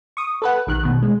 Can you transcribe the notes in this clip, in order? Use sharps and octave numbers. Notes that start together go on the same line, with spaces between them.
C#6 D#6
A4 B4 F#5
A#1 D#3 F#6
B2 D#3
G#3